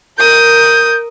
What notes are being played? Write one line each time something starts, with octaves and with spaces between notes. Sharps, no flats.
A#4 D#6 G6